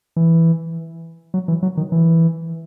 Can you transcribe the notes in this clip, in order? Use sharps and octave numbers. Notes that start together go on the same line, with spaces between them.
E3
F#3
E3
F#3
D#3
E3